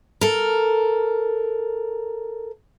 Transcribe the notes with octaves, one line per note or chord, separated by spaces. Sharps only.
A4 A#4